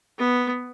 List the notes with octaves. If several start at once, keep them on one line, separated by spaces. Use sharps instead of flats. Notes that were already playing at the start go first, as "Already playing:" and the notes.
B3